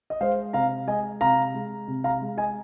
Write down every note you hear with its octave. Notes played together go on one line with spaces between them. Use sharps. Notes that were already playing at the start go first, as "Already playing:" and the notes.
D#5
G#3 C5 F5
C3 F5 A#5
G#3 D#5 G#5
C3 F5 A#5
G#3
C3
F5 A#5
G#3
D#5 G#5